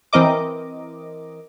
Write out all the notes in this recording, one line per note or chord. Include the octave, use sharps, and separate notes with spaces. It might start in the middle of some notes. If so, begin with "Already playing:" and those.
E3 C4 A#4 D#5 D6